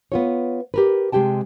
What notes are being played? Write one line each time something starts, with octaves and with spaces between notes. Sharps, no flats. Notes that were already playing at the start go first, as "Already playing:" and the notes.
B3 F4 C#5
G4 A#4 B4
C3 G#3 G4 G5 A5